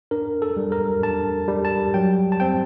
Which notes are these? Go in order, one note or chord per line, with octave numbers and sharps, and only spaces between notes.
D4 A#4
A4
G3
A#4
D4 A5
G3
A5
F#3 G5
A5
C4 G5